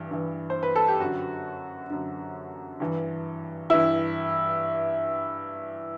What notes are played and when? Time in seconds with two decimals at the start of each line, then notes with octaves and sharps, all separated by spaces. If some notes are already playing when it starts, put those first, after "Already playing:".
Already playing: G2 E3
0.11 G2 E3
0.50 C5
0.63 B4
0.76 A4
0.88 G4
1.00 F#2 D3 F#4
1.90 F#2 D3
2.80 G2 E3
3.70 G2 E3 E4